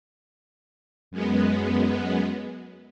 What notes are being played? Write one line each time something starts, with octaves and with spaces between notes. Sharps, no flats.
F#2 G#3 B3